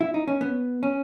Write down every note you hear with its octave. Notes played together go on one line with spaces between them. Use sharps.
E4
D#4
C#4
B3
C#4